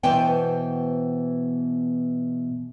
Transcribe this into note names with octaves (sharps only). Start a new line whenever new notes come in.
B2 E3 B3 C5 G5 G#5